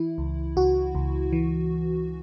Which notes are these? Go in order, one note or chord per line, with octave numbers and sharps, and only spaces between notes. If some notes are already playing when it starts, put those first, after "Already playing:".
Already playing: E3 E4
C#2
C#2 F#4
C#2
E3